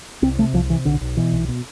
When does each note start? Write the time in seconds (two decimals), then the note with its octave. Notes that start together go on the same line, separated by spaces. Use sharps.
0.22 C2 C4
0.39 C3 A3
0.53 C2 F3
0.70 C3 E3
0.85 B1 D3
1.01 B1
1.17 B2 E3
1.32 B1
1.48 B2